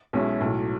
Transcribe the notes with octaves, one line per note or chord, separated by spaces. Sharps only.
B1 B2 G#3 C#4 E4
B1 A2 F#3